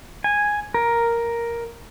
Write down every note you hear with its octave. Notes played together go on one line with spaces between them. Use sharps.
G#5
A#4